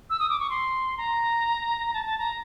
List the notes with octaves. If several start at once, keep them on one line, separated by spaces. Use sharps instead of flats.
E6
D#6
D6
C#6
C6
A#5
A5
A5
A#5